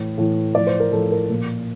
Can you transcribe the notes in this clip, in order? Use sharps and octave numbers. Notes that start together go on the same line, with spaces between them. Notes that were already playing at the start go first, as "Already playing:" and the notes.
Already playing: A2 E3
A2 E3
A2 F3 D5
C5
A#4
A2 F3 A4
A#4
A#2 F3